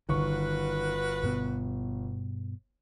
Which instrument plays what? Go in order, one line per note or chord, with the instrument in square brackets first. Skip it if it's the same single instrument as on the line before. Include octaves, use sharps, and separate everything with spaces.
[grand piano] G1 C#6 [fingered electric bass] D#3 [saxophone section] F#4 A#4 B4
[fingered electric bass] G2 B2 B3